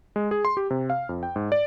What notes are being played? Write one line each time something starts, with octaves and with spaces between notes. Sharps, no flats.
G#3
G#4
C6
G4
C3
F5
F2
G5
G#2
D5